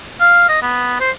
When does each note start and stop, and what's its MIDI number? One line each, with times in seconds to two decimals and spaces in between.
0.20 0.45 77
0.49 0.59 75
0.62 0.95 59
1.00 1.11 72